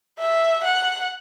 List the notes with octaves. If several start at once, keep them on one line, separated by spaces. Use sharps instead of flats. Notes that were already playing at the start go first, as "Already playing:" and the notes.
E5
F#5